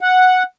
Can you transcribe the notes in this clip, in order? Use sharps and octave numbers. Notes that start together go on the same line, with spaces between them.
F#5